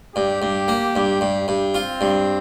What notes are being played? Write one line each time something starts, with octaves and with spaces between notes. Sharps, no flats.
G2 G4
G2
A#3
G2
G2
G2
C4 F4
G2